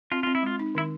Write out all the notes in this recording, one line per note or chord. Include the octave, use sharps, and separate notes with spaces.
C4 F4
F4
C4
E4
G#3 F4
D#4
D#3 E4